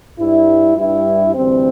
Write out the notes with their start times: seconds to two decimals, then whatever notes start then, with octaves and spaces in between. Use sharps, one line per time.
0.19 G2 G3 E4
0.77 G2 G3 E4
1.34 D2 C3 E3 G3 C4